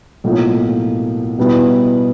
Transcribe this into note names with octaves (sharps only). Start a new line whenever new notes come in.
B1 A2 F3 A#3 D#4
B2 G3 B3 E4